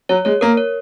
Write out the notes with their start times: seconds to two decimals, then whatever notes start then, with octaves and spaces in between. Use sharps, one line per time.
0.09 F#3 C#5
0.25 G#3 C#5
0.41 A#3 A#4
0.57 C#5